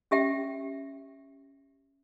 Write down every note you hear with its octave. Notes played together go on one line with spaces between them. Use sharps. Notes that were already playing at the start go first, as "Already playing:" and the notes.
C#4 G4 E5 G5